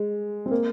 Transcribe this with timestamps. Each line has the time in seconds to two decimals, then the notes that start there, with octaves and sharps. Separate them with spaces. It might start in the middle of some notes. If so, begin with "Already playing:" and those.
Already playing: G#3
0.46 C4
0.51 A#3